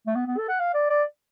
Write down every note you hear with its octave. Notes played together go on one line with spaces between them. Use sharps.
A3
B3
B3
A4
F#5
F5
D5
D5